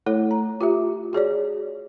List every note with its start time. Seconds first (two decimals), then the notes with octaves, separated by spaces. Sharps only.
0.06 A3 E4 A4 C#5
0.31 A#5
0.61 F4 G4 E5
1.13 F#4 G#4 C#5 D5